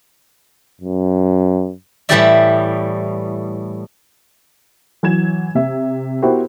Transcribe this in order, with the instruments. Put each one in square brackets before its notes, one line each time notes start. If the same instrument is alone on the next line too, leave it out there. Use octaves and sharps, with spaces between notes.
[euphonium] F#2
[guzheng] A2 E3 G3 G4 D5 E5
[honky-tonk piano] E3 F#3 G#6 E7
C3 E5
B3 E4 F#4 G4 A#4 C5